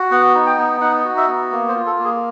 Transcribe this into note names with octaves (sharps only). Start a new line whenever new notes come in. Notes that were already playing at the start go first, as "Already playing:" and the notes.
Already playing: F#4
B3 F#5
D#4
G5
B3
D#4 F#5
F#4
E5
B3
A#3
C5
F4
A4
A#3
G#4